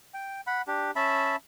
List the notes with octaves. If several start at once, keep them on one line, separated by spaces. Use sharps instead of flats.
G5
F#5 B5
D4 G4
C#4 E5 A5 B5